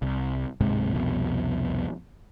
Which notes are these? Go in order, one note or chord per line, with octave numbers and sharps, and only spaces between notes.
C2
D1 G#2 C3 G#3
C2 F2 B2